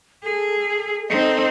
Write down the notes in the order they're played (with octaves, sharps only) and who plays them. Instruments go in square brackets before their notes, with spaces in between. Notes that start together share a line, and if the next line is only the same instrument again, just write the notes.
[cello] G#4 [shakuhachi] A4
[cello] C4 [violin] D#4 D#5 [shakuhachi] A4